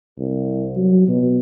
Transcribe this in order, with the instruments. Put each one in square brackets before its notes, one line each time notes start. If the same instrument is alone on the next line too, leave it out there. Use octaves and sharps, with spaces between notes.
[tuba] C2
F#3
B2